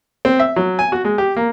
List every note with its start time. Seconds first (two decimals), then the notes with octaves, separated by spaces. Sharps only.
0.25 C4
0.39 E5
0.56 F#3
0.79 G#5
0.92 F#4
1.05 G#3
1.18 G4
1.36 A#3